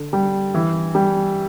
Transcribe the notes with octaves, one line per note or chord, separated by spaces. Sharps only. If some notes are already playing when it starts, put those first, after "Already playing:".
Already playing: D3
G3
E3
G3